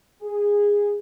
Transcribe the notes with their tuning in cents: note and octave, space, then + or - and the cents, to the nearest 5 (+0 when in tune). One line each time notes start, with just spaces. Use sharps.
G#4 -15